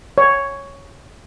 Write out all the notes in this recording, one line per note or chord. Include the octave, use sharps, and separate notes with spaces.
C#5